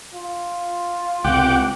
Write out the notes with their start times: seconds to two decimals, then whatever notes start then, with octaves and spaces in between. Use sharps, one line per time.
0.14 F4
1.24 C#2 C3 F#5 G5 D6